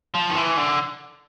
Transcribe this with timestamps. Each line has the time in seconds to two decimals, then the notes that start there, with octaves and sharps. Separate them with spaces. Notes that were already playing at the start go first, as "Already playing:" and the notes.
0.14 F3
0.30 D#3
0.36 E3
0.57 D3